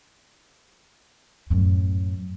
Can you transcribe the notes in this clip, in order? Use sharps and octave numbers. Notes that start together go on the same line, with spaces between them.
F#2 A2